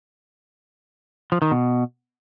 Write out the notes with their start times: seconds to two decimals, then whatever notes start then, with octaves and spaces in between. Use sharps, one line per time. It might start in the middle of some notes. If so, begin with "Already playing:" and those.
1.32 F3
1.42 D#3
1.51 B2